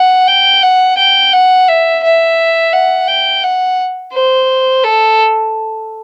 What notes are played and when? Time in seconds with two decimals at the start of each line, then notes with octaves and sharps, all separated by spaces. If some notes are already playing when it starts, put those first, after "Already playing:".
Already playing: F#5
0.27 G5
0.63 F#5
0.97 G5
1.33 F#5
1.68 E5
2.03 E5
2.73 F#5
3.08 G5
3.43 F#5
4.13 C5
4.84 A4